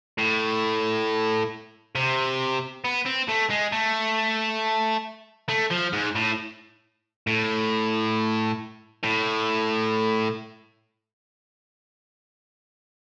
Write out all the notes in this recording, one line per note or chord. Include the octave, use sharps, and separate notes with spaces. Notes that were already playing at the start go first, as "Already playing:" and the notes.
A2
C3
B3
C4
A3
G#3
A3
A3
F3
G#2
A2
A2
A2